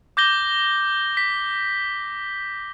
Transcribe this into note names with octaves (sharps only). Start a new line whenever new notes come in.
D6 G6 A#6 G7
B6